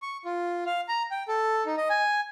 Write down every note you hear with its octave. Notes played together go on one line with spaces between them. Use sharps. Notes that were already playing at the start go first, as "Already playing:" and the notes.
C#6
F4
F5
A#5
G5
A4
D#4
D#5
G#5